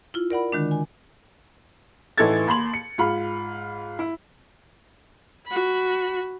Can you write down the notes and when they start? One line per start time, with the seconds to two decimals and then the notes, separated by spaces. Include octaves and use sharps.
0.14 E4 F4
0.30 A#4 D5 F#5 B5
0.52 D3 D#3 G#3 D4
0.71 G#5
2.17 A1 E3 D#4 A4 G#6 A6
2.47 D#2 B5 C6 F#7
2.73 C#7
2.98 G#2 F4 B5
3.99 E4
5.47 F#4 B5